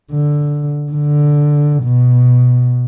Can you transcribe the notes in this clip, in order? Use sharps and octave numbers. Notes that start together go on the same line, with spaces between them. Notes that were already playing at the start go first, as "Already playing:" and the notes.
D3
D3
B2